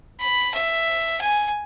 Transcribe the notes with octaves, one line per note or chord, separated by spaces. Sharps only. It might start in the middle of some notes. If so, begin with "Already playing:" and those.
B5
E5
G#5